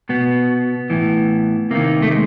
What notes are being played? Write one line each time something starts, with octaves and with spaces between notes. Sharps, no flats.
B2 B3
A2 E3
C3 D#3 A#3
A3
G#3